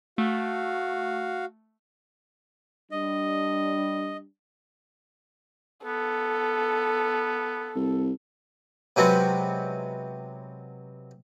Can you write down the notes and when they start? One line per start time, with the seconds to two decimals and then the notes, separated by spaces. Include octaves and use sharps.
0.18 A3 F#4 F5
2.91 G3 D4 D#5
5.85 B3 A4
7.76 C2
8.96 C3 F#3 G#3 B3 C4